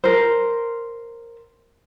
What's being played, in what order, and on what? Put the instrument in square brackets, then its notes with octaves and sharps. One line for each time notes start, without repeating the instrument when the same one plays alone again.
[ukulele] A#4 C5